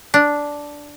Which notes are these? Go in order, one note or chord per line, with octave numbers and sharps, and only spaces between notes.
D4